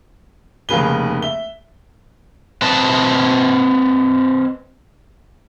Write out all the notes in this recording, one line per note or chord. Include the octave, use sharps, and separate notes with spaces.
F1 C#3 A#3 G#4 B4 G7
E5 G7
C4 B4 D#5 A5